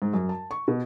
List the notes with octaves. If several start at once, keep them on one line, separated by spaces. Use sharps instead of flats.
G#2
F#2
A5
C#6
B2